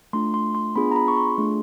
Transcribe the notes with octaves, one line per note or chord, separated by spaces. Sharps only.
A3 D4 F4 C6
C6
C6
B3 D4 F4 G#4 B5
A#5
B5
C#6
C6
A3 D4 F4 G#4